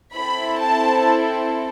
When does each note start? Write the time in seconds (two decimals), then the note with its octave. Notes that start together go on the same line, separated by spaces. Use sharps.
0.14 C4 E4 A4 B5
0.59 A5